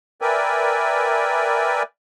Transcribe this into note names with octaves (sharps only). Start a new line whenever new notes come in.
A#4 B4 D5 E5 G5 G#5